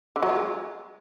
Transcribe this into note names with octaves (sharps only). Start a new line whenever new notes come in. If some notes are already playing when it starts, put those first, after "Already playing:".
D3
F#3
F4
G#3